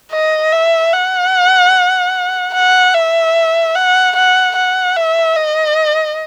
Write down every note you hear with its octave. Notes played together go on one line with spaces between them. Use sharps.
D#5
E5
F#5
F#5
E5
F#5
F#5
F#5
E5
D#5